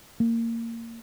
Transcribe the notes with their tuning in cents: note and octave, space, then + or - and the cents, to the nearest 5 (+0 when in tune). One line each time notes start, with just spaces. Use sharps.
A#3 -20